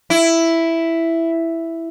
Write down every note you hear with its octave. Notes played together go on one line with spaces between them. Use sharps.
E4